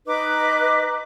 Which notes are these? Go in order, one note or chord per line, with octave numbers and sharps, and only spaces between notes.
D#4 B4 D#5 D6